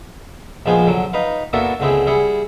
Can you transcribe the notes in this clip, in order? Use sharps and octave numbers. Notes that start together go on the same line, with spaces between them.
A#1 F3 G#3 B3 C5 G#5
D3 F#3
D#4 B4 F5
A#3 B3 D4 E4 F#4 A4
C#2 D3 C4 E4 G#4
G3 E4 G#4 F#5